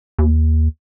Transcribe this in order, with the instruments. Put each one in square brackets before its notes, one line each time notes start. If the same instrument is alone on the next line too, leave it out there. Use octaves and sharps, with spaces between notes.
[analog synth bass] D#2